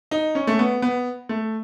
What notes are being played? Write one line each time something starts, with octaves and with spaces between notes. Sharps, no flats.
D#4
C#4
A3
B3
B3
A3